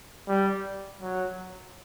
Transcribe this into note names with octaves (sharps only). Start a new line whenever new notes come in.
G3
F#3